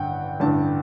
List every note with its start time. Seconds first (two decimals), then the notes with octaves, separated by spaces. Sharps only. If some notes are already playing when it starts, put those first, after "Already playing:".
Already playing: A1 G2 D3 F#5 G5
0.40 A1 G2 D3 A5